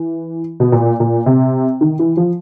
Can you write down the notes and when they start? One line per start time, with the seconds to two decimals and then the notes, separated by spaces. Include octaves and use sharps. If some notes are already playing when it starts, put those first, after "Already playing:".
Already playing: E3
0.60 B2
0.72 A#2
1.00 A#2
1.26 C3
1.81 D#3
1.99 E3
2.17 F3